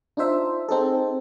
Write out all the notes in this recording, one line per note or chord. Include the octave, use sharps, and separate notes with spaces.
D4 D#4 F4 C5 E5
C4 D#4 G#4 A4